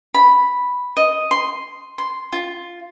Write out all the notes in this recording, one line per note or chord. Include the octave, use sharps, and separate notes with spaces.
B5
D#5
C6
C6
F4